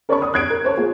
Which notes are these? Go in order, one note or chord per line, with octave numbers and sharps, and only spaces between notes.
A#4 C#5 D5 A5 B5 C#6
D5 D#6
F#6 G#6 D7
A#4
C5 C#5 A5
A#3 F4 G#4